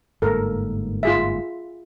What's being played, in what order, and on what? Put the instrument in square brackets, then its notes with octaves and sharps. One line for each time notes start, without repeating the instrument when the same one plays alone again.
[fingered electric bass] G1 G#2 A#3 [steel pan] A4 A#4
[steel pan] F4 G#4 E5